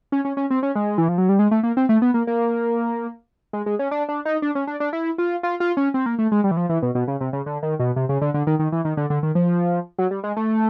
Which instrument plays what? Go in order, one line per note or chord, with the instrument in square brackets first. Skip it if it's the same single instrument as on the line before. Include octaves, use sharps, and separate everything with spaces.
[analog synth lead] C#4
C#4
C#4
C4
C#4
G#3
E3
F3
F#3
G3
G#3
A3
A#3
C4
A3
B3
A#3
A#3
G#3
G#3
C#4
D4
D4
D#4
D4
C#4
D4
D4
E4
F4
F4
F4
C#4
C4
A#3
A3
G#3
G3
E3
F3
E3
B2
B2
C#3
C3
C#3
D3
D#3
B2
C3
C#3
D3
D3
D#3
D#3
E3
D#3
D3
D3
D#3
F3
F#3
G3
G#3
A3